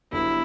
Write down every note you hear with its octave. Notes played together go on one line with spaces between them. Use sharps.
G1 G2 D3 F#3 B3 E4